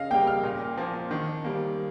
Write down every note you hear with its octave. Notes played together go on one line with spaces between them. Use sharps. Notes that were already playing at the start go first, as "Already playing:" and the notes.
Already playing: C#3 D#5 F5
G3 A#3 G5
F6
A#2
F3 A#3
D#3
G3 A#3